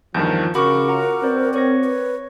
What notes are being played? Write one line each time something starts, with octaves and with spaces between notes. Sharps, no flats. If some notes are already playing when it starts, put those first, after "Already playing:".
E2 G2 D#3 F3 A5 G6
C#3 F#4 A#4 B5 C#6 D6
F4 F#5 A#5
C4 B4 C5 D5
A#4 C#5 C#6 A#6
B4